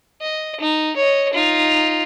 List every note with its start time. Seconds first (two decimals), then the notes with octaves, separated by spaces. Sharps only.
0.21 D#5
0.60 D#4
0.96 C#5 D#5
1.33 D#4 F4